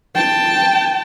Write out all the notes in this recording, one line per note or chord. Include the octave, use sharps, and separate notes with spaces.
G5 A5